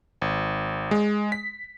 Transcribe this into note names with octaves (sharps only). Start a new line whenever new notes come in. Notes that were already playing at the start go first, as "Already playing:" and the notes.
G#1
G#3
B6